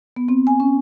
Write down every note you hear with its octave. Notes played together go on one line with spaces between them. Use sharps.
B3
C4
G#5
C#4